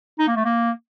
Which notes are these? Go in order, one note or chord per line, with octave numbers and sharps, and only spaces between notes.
D#4
A#3
A3
A#3